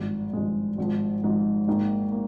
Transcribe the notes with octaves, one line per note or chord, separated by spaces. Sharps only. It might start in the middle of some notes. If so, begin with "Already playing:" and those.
Already playing: G#1 G2 F3 G#3
G#1 G2 F3 G#3
G#1 G#2 F3
G#1 G#2 F3
G#1 G#2 D#3 A#3
A#3